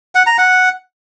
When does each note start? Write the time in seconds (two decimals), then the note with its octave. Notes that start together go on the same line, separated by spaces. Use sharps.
0.15 F#5
0.27 A#5
0.38 F#5